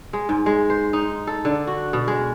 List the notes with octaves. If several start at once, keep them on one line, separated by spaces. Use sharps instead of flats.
G#3
G#2
G#3
C5
D#4
A4
D3
F#4
B2
G#3